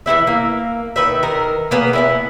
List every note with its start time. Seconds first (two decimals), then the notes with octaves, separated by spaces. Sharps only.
0.06 E3 F#3 E4 E5
0.27 A#3
0.96 D#3 B4 E5
1.23 D#3 A#4
1.71 A#3 B3 G#4
1.93 B3 C#4 E4